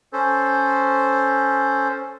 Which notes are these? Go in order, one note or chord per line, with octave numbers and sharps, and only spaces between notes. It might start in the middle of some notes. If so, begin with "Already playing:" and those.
C#4 A4 C5